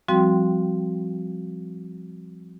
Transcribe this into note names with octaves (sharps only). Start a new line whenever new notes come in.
F3 G3 C4 F#4 G5 C6